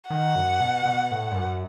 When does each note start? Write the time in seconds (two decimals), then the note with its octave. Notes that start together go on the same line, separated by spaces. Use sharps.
0.10 D#3 F#5
0.35 F#2
0.60 B2
0.85 B2
1.11 A2
1.31 G2
1.37 F#2